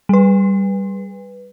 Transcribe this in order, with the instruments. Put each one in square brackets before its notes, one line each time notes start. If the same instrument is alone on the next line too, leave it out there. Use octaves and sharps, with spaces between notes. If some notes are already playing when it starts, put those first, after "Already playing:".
[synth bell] G3 B4